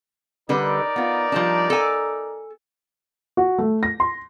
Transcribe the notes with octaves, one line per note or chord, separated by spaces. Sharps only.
D3 G3 D#4 A#4 B4 D5
B3 F4
F3 G3 D4
A4 G#5
F#4
A3
A#6
C6